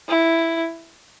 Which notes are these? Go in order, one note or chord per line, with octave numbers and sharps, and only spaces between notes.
E4